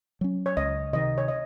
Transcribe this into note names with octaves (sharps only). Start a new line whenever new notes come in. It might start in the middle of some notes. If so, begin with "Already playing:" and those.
F#3 C#4
C#5
C#2 D#5
C3 D#3 D#5
C#5
D#5